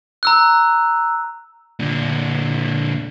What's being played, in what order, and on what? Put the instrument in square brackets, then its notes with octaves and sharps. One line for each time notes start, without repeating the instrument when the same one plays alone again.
[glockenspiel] A#5 E6 F#6
[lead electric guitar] A#2 D3